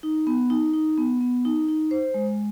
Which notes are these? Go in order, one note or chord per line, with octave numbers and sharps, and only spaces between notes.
D#4
B3
D#4
D#4
B3
B3
D#4
D#4
C5
G#3